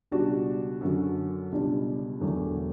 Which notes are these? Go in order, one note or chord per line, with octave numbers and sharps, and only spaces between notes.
C#2 B2 G3 D4 F#4
F#2 D3 F#3 C#4 F#4
C#2 B2 G3 D4
E1 E2 D3 F#3 A3